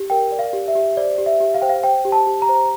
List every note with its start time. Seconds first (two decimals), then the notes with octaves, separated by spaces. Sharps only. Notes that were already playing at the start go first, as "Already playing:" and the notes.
Already playing: G4
0.10 A#4 G5
0.32 D5
0.39 F5
0.53 G4
0.68 E5
0.75 G4
0.97 C5 D5
1.18 G4
1.26 E5
1.41 G4
1.54 F5
1.62 C5 G5
1.69 F5
1.84 C5 G5
2.05 G4
2.12 A5
2.27 G4
2.42 A#5
2.49 C5